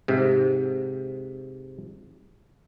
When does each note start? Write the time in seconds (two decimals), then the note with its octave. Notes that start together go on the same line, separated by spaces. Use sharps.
0.08 G#2 C3